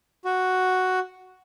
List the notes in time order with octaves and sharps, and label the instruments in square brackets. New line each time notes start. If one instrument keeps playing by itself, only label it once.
[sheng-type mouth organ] F#4